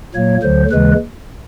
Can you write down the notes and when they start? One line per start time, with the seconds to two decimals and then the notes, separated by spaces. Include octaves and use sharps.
0.14 A#2 F#3 A#3 C#5
0.43 D2 D3 F#3 C5
0.71 D#2 C#3 E3 G#3 B4